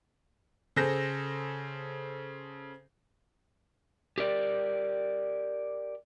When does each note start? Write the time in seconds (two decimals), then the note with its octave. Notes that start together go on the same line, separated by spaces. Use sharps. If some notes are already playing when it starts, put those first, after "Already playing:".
0.76 C#3 G#4 A4 C5 G6 A#6
4.18 G4 A#4 D5